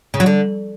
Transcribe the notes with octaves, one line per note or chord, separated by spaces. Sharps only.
C#3
F#3
D3